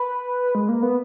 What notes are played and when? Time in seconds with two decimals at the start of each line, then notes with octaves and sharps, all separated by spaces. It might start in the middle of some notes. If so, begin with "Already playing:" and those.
Already playing: B4
0.55 G#3
0.69 A#3
0.82 B3